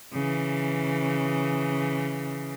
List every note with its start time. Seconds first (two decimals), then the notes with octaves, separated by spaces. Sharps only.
0.13 C#3 E3